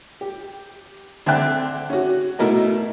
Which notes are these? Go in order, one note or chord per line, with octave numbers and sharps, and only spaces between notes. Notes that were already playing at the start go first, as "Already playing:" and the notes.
G4
D3 C4 D5 E5 G5 F#6
C#4 F#4
B2 A3 E4 A#4 D#5